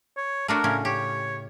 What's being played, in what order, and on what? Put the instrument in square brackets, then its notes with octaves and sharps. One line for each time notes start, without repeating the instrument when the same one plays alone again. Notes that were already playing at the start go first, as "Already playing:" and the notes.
[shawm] C#5
[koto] A3 D4 F#4 [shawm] A#4
[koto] A2 C#3 C#4
[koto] G4 [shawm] C#5